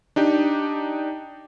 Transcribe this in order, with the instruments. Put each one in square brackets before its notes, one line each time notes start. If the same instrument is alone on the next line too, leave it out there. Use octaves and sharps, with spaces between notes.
[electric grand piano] D4 D#4 G4